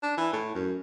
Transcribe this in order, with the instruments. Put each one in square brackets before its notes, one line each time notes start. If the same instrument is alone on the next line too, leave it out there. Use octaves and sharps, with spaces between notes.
[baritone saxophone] D4
E3
A2
F#2